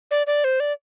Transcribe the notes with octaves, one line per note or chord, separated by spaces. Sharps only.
D5
D5
C5
D5